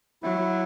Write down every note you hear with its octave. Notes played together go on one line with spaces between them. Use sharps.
F#3 E4